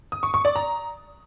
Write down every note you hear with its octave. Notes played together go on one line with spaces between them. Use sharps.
D#6
C#6
C#6
D5
A#5